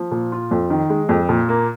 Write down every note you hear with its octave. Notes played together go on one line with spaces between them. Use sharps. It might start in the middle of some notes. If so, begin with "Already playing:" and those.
Already playing: F3
A#2
F4
F2
D#3
G#3
F2
A#2
A#3